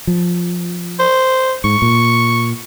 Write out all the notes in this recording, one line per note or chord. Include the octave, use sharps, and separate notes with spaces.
F3
C5
G#2 C#6
A#2